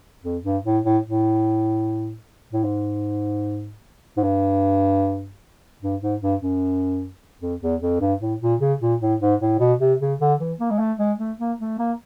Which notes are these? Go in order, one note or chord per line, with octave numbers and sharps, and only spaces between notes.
F2
G2
A2
A2
A2
A2
G#2
G#2
G2
G2
G#2
G2
F#2
F2
E2
F2
G2
A2
A#2
C#3
A#2
A2
G#2
A2
B2
C3
C#3
D3
E3
A#3
G#3
A3
G#3
A3
A#3
A3
A#3